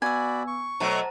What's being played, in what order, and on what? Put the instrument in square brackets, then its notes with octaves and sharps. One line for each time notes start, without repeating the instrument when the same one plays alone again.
[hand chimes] B3 E6 [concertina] F#4 D5 B5 [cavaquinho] G#5
[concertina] C#6
[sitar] B2 F#3 A3 [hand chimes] C5 A5 A#5